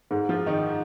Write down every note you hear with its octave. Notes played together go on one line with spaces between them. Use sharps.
G#2 G#3
F3 F4
D#3 D#4